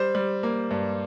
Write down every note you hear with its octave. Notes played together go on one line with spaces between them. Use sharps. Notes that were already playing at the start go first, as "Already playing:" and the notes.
Already playing: G3 C5
G3
A#3
G2